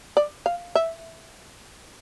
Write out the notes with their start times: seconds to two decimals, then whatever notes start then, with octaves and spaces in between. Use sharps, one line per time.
0.17 D5
0.46 F5
0.75 E5